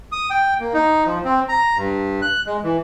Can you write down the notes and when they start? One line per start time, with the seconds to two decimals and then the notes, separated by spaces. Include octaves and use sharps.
0.12 D#6
0.30 G5
0.60 A#3
0.74 D#4
1.06 F3
1.25 C4
1.49 A#5
1.76 G2
2.22 F#6
2.47 G#3
2.63 E3